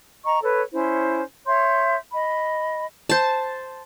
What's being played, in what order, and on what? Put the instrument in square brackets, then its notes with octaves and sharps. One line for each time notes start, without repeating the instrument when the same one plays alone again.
[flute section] D#5 A#5 C#6
A4 B4 C#5
C#4 E4 C5
C#5 E5 C6 G6
D#5 B5
[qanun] C5 A5